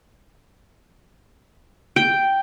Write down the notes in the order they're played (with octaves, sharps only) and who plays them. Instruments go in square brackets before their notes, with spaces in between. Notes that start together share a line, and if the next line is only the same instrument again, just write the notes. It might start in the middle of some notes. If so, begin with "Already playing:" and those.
[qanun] G5